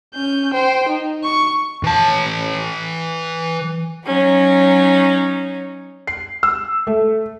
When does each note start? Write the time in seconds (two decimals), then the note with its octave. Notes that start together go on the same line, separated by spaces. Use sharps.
0.15 C#4 G6
0.54 C5 G5
0.89 D#4
1.24 C#6
1.84 E3 A5
4.06 F#3 C#4 D#4
6.07 C7
6.43 E6
6.87 A3